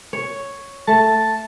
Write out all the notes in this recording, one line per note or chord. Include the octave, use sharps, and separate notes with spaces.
C#5
A3 A5